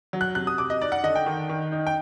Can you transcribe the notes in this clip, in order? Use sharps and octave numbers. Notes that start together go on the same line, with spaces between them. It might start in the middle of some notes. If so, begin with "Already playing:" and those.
F#3
F#6
C3 F#6
D#6
C3 D6
D#5
D#4 D5
F#5
D3 D#5
G5
D#3
D#3
D#4
G5